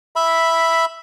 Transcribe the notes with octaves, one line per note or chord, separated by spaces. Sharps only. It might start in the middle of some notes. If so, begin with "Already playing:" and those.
E5 B5